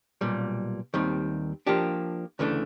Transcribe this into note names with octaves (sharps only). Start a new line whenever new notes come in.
B1 A#2 G3
D#2 D#3 G3 C4
F3 A#3 D4 G4
D2 C#3 E3 A3 D4